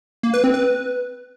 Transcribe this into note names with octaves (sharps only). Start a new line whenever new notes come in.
A#3
B4
C4
B4